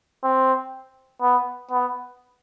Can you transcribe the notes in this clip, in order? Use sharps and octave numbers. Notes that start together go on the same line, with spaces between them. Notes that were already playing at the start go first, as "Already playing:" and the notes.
C4
B3
B3